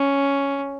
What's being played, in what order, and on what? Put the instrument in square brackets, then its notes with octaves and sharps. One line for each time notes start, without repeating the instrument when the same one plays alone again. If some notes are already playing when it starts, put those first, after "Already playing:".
Already playing: [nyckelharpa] C#4